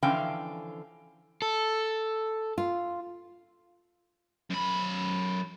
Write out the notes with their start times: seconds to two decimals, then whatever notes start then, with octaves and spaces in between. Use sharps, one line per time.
0.02 D3 E3 F3 C#4 F5 G5
1.42 A4
2.58 F4
4.50 F#2 B5